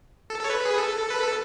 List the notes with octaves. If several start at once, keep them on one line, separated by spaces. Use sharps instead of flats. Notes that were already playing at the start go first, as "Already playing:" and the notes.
A4
A4 C#5
B4
G#4
A4
B4
A4